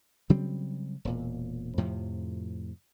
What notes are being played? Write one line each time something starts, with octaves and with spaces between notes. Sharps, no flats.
C#3 F#3 G3 C4
E1 A#2
F2 A2 C3 F3